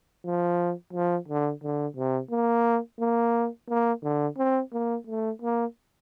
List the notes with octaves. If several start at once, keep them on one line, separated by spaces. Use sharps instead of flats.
F3
F3
D3
D3
C3
A#3
A#3
A#3
D3
C4
A#3
A3
A#3